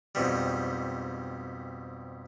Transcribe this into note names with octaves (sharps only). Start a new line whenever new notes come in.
F2 G#2 B2 G3